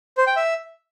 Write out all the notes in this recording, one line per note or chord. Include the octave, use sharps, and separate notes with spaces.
C5
G5
E5